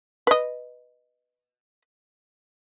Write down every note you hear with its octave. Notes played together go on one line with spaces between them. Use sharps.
B4 D#5